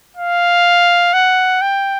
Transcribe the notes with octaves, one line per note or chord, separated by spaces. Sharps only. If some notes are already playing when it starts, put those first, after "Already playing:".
F5
F#5
G5